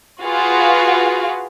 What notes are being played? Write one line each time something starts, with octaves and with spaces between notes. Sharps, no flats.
F4 F#4 G#4 B4 F5